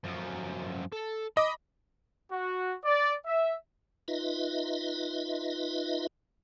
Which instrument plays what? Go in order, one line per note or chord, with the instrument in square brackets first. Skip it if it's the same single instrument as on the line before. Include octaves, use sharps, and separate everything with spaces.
[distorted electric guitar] F#2 F3
A4
[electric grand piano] D#5 D6 [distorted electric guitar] B5
[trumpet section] F#4
D5
E5
[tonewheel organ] D#4 F4 B4 D#5 E5